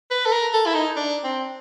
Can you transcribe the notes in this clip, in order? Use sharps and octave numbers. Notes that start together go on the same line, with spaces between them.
B4
A4
A#4
A4
E4
D#4
D4
C4